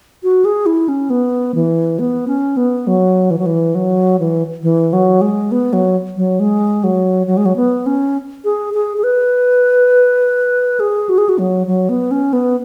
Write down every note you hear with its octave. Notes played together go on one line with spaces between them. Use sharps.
F#4
G#4
E4
C#4
B3
E3
B3
C#4
B3
F#3
E3
F#3
E3
F#3
E3
E3
F#3
G#3
B3
F#3
F#3
G#3
F#3
F#3
G#3
F#3
B3
C#4
G#4
G#4
G#4
B4
G#4
F#4
G#4
F#4
F#3
F#3
B3
C#4
B3